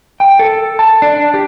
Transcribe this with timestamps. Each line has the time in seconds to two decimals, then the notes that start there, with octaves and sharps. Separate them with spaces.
0.20 G5
0.39 A4
0.79 A5
1.02 D4
1.34 G4